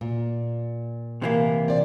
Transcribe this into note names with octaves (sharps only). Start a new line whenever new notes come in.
A#2
C3 E3 A#3
C4 D5